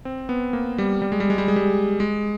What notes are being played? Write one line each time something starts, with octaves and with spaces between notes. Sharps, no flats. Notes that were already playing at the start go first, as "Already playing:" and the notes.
C4
B3
A#3
G3
G3
G#3
G3
G#3
G3
G#3
G3
G#3